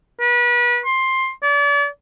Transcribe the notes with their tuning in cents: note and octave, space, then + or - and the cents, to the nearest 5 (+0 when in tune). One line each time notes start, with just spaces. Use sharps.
B4 -35
C6 +15
D5 -40